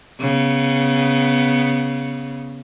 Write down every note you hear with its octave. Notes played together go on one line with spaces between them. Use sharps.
C#3 B3